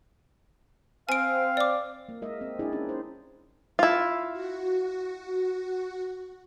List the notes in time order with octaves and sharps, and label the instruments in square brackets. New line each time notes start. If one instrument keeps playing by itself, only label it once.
[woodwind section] C4 F5 [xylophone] G#5 D7
[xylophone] D5 D6
[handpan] A#3
G#3 A#4 D#5 E5
C4
D4 E4 G#4 D5
C4 C#4 D#4 G#4
C5
[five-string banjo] E4 F4
[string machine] F#4